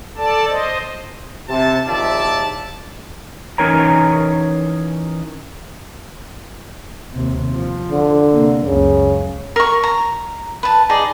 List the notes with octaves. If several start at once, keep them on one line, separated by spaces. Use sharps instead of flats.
A4 D5 A5
C5 D#5
C3 A5
A#1 D#2 F3 D5 E5 A5
E3 C#4 D#4 A#4 C#5 A#5
D#2 C3
F3
D3
C3 A#3
C#2 F#2 C#3
A#4 C#6
A#5
B4 A5
D#4 G#4 D5